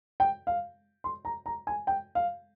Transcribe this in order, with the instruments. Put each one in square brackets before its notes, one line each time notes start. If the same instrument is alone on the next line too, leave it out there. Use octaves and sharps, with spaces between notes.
[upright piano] G5
F5
C6
A#5
A#5
G#5
G5
F5